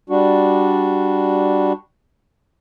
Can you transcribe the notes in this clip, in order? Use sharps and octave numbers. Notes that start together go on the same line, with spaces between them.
G3 D4 F#4